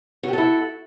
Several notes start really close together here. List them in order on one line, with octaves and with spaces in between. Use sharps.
F#4 G4 A4 E4